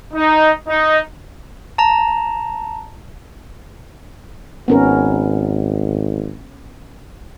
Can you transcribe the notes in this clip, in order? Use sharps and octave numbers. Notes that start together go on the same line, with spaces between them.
D#4
D#4
A5 A#5
G#1 B3 C#4 A#4